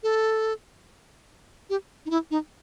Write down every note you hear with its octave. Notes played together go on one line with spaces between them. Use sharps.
A4
G4
D#4
E4
D#4